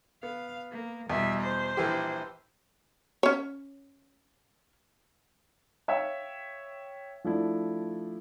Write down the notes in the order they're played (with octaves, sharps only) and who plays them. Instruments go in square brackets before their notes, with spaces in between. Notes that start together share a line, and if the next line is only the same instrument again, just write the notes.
[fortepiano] B3 [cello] F5
[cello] A#3
[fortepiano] E2 B2 [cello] G3 E5
[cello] C5
[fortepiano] A#1 E3 G4
[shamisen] C#4 C#5
[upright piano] C#5 E5 F5 G5 E6
F3 A3 D4 E4